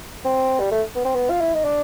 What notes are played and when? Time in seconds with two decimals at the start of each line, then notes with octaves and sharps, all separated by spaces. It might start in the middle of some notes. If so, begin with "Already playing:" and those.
0.25 C4
0.60 G3
0.71 A3
0.95 B3
1.05 C4
1.15 B3
1.30 F4
1.41 E4
1.53 D#4
1.65 D4